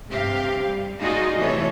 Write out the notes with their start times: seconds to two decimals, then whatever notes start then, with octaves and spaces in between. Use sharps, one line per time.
0.10 G2 C3 G4 F5
0.66 G3
1.01 D#4 F4 F#4 G#4 D5 D#5
1.38 C3 E3 A3 A4 C#5